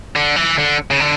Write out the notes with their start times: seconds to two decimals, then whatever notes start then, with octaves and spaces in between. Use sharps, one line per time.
0.16 D3
0.36 E3
0.58 D3
0.91 C#3
1.00 D3